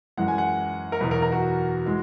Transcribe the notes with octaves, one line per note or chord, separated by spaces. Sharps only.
F#2 E3 G#3 F#5
G#5
F#5
A#4
E2 B2 F#3 B4
A#4
A#4
F#4
E3 G#3